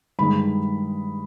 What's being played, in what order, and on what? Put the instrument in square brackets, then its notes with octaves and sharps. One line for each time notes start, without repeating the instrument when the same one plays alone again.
[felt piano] G2 D#3 G#3 B5